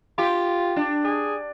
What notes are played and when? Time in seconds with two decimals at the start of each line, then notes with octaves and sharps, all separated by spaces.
0.18 F4 G4
0.76 D4
1.04 G#4